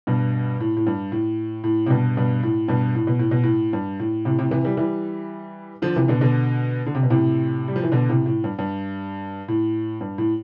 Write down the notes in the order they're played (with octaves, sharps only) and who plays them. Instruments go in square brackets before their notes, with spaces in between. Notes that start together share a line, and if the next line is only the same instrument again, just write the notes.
[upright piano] G2 B2
A2
A2
G2
A2
A2
C3
G2 B2
G2 B2
A2
G2 B2
A2
B2
A2
B2
A2
G2
A2
A2 C3
A2 C3
C3 E3
E3 G3
E3 G3
D3 F3
C3 E3
B2 D3
B2 D3
D3
C3
B2
A2 C3
G3
F3
E3
B2 D3
A2 C3
A2
G2
G2
A2
G2
A2